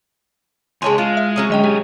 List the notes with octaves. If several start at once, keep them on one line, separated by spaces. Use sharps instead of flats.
C#2 G#3 C#5 G#5 A5 C6
G#3 F4
E5
F#3 C#4 G#4
D2 G#3 D#5 G5
B1 G4 G#5